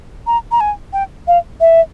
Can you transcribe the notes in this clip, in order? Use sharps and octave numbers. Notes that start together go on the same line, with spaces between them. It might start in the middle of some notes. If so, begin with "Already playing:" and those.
A#5
A#5
G#5
G5
F5
E5